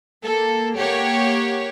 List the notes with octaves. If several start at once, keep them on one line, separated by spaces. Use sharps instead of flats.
A#3 A4
A#3 G4 C#5 F#5